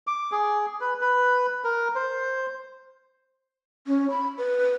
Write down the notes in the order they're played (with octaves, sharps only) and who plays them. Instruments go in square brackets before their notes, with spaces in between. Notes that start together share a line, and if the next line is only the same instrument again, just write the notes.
[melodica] D6
G#4
B4
B4
A#4
C5
[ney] C#4
B5
B4